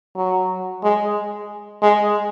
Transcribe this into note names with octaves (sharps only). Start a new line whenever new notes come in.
F#3
G#3
G#3